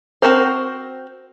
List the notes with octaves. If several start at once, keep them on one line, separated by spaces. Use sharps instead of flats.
C4 D4 F#4 A#4 C5